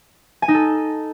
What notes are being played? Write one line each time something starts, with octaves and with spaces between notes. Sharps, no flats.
G#5
D#4
A4